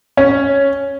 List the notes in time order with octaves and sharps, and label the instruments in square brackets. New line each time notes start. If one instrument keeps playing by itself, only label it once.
[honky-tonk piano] C#4